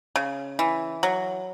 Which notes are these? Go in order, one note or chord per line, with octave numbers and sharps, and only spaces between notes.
C#3
E3
F#3